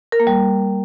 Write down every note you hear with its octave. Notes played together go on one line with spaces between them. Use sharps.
A#4
A#3
G3